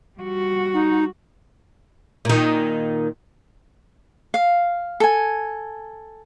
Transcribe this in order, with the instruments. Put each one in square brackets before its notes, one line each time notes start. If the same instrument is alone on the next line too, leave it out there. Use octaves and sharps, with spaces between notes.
[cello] G3 F#4
[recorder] D#4
[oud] A#2 D#3
[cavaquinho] F5
A4 G#5